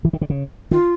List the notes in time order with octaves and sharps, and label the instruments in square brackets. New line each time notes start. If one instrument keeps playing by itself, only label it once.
[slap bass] E3
D#3
D3
C#3
[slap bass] D#3 [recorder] F4